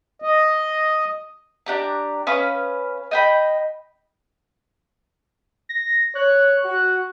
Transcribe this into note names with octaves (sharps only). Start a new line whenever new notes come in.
D#5
D4 G4 A#5
C#4 B4 F5 D#6
D#5 G5 B5
A#6
C#5 F#6
F#4